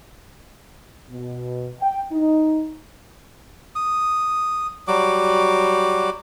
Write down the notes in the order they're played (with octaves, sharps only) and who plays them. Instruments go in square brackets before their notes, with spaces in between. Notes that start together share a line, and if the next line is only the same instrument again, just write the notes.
[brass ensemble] B2
G5
D#4
[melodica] D#6
F#3 G3 F#4 D6